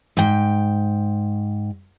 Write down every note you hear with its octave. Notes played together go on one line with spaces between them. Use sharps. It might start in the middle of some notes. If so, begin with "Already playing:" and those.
G#2 G5